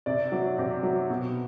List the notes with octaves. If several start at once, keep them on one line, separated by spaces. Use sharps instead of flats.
C3 D5
F#3
C3
F#3
B2